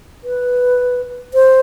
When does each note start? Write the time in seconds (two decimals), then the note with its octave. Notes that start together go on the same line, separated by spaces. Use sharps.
0.24 B4
1.34 C5